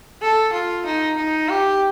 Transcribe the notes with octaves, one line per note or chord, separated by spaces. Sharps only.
A4
F4
D#4
D#4
G4